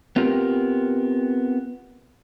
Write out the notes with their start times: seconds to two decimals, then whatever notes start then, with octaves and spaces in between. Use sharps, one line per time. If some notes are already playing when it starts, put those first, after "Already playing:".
0.16 B3 C4 F4 G4 A#4